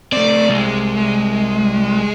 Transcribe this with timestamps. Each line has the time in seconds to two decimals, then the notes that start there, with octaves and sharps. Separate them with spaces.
0.13 A3 C4 D5
0.50 C2 G#3